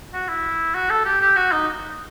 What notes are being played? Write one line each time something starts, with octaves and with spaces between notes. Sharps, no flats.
F#4
E4
F#4
A4
G4
G4
F#4
D#4